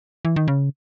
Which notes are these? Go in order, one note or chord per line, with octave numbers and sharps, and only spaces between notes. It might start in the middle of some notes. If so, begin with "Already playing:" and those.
E3
D#3
C#3